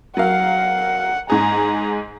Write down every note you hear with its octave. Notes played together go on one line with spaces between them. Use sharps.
F#3 A#4 F5 F#5
G#2 G#4 A#5